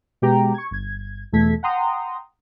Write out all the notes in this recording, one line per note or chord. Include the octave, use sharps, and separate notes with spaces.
B2 G#3 G4 G5 A#5
C#6 G#6
G1 G#6
E2 B2 A3 A4 G#6 B6
F#5 G5 A#5 C6 D#6